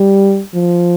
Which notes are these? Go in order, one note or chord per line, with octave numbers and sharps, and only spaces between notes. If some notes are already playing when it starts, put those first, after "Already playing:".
Already playing: G3
F3